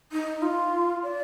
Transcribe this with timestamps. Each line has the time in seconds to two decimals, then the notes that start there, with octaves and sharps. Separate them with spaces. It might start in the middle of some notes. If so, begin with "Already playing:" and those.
0.12 D#4
0.42 F4
1.03 D5